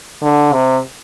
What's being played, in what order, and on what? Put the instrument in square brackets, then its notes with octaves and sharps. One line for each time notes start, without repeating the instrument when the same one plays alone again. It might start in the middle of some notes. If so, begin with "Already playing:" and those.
[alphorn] D3
C3